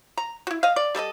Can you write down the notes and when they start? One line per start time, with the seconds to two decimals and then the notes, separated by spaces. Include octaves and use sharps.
0.17 A#5
0.47 E4 F#4
0.63 D#5 F5
0.76 D5
0.95 G3 A4 A#4 D#5